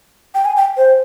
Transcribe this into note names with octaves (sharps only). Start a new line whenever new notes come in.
G5
G#5
G5
C5